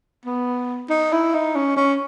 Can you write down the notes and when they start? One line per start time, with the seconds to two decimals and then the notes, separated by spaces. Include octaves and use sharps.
0.25 B3
0.90 D#4
1.12 E4
1.34 D#4
1.55 C#4
1.76 C#4